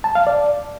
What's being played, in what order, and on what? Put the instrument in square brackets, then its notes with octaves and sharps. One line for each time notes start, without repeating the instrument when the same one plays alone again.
[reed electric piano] A5
F5
D5